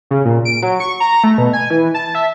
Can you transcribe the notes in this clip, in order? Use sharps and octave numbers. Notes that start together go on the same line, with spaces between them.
C#3
A#2
D7
F#3
C#6
A#5
A3
B2
G#5
E3
A5
E5